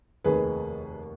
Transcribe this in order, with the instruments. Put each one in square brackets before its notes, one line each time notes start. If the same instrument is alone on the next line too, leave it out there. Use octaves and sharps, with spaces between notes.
[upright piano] F1 D#2 D#3 G#4 B4